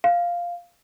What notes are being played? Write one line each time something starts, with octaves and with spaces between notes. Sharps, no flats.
F5